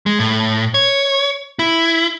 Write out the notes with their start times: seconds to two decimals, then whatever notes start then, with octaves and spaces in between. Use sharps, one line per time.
0.06 G#3
0.20 A2
0.74 C#5
1.59 E4